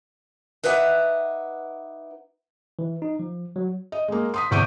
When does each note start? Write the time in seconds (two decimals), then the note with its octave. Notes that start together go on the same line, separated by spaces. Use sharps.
0.63 D#4 B4 D5 E5 F#5
2.79 E3
3.02 D#4
3.19 F3
3.56 F#3
3.92 D#5
4.08 G#3 A#3
4.34 C6 D#6 B6
4.51 E2 C3 C#6 G6 D7 D#7